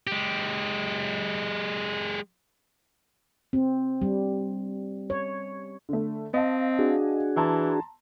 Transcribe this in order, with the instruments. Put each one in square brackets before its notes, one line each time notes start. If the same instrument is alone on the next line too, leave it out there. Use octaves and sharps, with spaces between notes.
[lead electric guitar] G#3 G4
[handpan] C4
G3
C#5
[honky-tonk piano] D3 A3
[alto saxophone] C4 [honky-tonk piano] D#5 F5 A5
[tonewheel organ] D4 F#4 G#4
[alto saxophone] E3 [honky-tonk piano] A5 A#5 C6